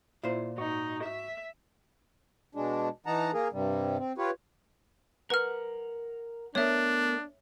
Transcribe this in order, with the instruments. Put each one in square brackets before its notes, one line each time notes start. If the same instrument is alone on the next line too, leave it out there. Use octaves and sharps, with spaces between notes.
[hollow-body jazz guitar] A#2 C5 [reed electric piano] E4 F4
[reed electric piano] G#2 F#4 C#6 [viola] D#4
[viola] E5
[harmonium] B2 G#3 D4
E3 D#4 F#5 A5 A#5
A#3 G#4 A#4
G2 C3 G3
C4
F4 G4 B4 C#5
[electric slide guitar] A#4 F#5 [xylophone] B4 F6
[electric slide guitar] A3 B3 A#4 [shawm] D4 [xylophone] C#5 E5